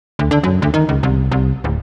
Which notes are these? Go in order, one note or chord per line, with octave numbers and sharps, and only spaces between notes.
D2
D3
F#2
D2
D#3
C#2
C2
C2
D1